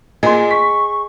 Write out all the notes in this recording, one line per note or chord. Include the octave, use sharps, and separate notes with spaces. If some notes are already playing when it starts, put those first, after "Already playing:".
A#2 G#4 D#5 C6
C#6 B6